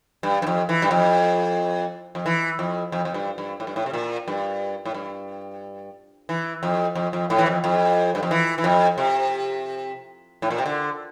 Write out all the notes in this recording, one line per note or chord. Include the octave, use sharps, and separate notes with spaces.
G2
G2
F2
E3
G2
F2
F2
E3
F2
F2
F2
G2
G2
A2
G2
A2
C3
A#2
G2
A2
G2
E3
F2
F2
F2
A2
E3
F2
F2
G2
F2
E3
E3
F2
C3
A2
A#2
C3
D3